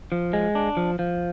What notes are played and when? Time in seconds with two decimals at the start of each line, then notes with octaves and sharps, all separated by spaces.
0.12 F3
0.33 G#3
0.55 D4
0.77 F3
0.99 F3